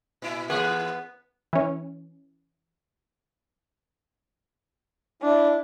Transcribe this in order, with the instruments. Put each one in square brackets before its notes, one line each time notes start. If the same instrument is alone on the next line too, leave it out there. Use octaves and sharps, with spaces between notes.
[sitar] A#2 E4
[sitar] A2 E3 G#4 [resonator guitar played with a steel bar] B3
[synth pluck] E3 C#4
[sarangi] D4 [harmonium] E4